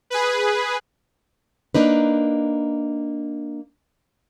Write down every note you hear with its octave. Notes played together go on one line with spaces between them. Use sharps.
G#4 B4
A#3 D4 D#4 B4